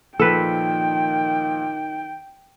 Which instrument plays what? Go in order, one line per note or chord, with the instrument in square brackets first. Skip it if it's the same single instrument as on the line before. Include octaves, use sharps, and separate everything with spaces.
[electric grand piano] A#2 F3 [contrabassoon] D#3 [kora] A4 B4 [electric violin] G5